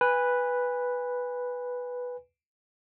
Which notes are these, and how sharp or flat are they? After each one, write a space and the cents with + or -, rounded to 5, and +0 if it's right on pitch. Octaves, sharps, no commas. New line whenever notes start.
B4 +0 G#5 -25